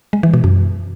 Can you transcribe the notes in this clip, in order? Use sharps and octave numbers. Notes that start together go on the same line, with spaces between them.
G#3
E3
B2
F#2